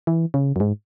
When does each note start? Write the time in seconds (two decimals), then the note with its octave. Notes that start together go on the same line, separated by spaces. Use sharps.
0.07 E3
0.34 C#3
0.56 F#2
0.60 G#2